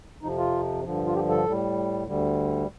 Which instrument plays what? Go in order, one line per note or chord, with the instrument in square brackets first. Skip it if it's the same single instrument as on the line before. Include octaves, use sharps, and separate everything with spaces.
[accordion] F2 C3 F3 D#4
F4
G2 D3 F3
F4
G4
A4
A2 G3
D2 D3 G3